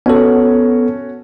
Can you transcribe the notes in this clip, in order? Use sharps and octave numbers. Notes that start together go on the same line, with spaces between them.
B3 C#4 F#4 A4 C#5